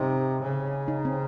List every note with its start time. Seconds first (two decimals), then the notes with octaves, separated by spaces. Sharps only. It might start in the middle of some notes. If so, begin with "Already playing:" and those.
Already playing: C3 D#4
0.42 C#3
0.88 D#4
1.05 C4